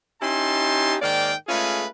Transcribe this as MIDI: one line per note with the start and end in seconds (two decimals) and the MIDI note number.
0.21 0.95 61
0.21 0.95 63
0.21 0.95 64
0.21 0.95 67
0.21 0.95 81
0.21 0.95 84
1.02 1.32 44
1.02 1.32 51
1.02 1.32 58
1.02 1.32 74
1.02 1.32 77
1.02 1.32 79
1.48 1.85 56
1.48 1.85 57
1.48 1.85 61
1.48 1.85 65
1.48 1.85 68
1.48 1.85 71